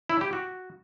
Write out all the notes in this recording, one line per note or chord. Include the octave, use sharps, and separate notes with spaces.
E4
G4
F#4